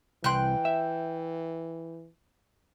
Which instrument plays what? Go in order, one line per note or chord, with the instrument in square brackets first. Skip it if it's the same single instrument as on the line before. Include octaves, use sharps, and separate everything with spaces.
[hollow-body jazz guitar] C2 C6 [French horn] E3 [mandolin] G5 F#6
[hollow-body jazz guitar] E5